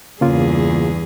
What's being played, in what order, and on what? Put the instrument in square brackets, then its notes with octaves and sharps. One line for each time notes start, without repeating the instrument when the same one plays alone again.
[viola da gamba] E2 G2 G#4 [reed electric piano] C#3 A#3 F4